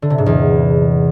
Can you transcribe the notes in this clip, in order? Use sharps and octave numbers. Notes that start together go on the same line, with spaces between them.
D3
C3
G#2
E2